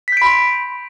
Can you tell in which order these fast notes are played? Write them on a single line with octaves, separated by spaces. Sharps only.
B6 G6 D7 B5 C6